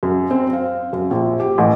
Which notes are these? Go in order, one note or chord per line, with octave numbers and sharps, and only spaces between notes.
F#2
C4
F5
F#2
A#1
G4
A1